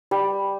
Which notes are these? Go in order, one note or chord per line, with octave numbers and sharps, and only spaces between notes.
G3